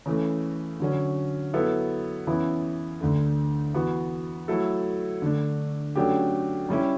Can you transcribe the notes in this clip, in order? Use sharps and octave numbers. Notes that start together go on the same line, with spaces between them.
C#3 E3 A3
D3 F#3 C#4
F#3 B3 E4 A4
C#3 E3 B3 E4
D2 D3 A3
E3 B3 F#4
F#3 A3 E4 A4
D3 A3 D4
C#3 F#3 A3 D4 G4
C#3 G3 C#4 E4